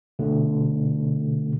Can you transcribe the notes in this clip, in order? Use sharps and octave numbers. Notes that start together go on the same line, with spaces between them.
B2 D3 A3